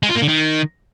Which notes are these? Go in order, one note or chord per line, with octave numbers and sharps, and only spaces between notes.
G#3
F4
A#3
D3
D#3